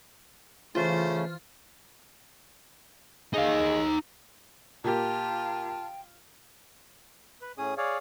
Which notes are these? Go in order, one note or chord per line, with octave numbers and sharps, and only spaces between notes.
C#3 E3 A3 C#4 F4 C5
G#3 D#4 F5
A#2 F4 G4 G5 A5
B4
A2 C#4 G#4 D#6
G#4 C#5 D5 F5